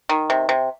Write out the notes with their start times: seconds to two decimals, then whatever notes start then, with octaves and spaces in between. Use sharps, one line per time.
0.09 D#3
0.30 C3
0.49 C3